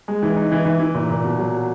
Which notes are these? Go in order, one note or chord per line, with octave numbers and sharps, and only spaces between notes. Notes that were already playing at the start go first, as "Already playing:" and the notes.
G#3
E3
D#4
E3
E3
E3
A#2
A#2
B2
F#3